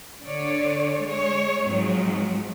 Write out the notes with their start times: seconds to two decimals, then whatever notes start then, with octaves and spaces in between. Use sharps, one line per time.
0.24 D3 C#5 D5
1.01 G#3 C#5
1.66 G#2 F3 F#3 C4